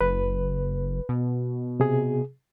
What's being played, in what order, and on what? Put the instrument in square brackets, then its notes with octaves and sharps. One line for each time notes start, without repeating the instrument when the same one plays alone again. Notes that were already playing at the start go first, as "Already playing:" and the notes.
[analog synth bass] F#1 [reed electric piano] B4
[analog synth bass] B2
[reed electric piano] C3 G#4